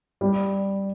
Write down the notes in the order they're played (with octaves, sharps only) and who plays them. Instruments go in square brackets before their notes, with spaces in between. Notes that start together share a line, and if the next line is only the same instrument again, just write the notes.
[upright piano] G3